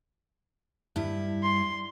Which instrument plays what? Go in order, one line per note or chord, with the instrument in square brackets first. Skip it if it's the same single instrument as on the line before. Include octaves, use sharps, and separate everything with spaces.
[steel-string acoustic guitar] G2 E4
[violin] C6